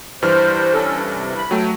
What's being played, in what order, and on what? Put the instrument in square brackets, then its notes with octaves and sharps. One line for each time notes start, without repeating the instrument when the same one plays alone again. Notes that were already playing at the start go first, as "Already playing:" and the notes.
[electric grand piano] G2 E3 F6 [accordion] C5
[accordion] C#4 A4
C3
B5
[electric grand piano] F#3 A3 [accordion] G5